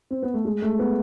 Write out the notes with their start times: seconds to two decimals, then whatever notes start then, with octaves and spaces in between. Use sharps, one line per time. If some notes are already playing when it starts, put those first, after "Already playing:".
0.11 C4
0.23 B3
0.34 A3
0.45 G#3
0.62 A3
0.79 B3